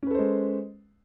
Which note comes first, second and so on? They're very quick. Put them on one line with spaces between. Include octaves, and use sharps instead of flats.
C#4 B4 A4 C5 G#3